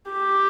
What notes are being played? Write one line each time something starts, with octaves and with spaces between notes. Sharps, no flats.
G4